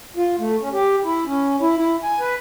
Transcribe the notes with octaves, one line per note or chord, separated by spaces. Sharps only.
F4
A3
C#4
G4
E4
C#4
E4
E4
G#5
B4